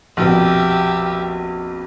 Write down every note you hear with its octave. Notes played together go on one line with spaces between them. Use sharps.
A#1 F2 B2 G4 E5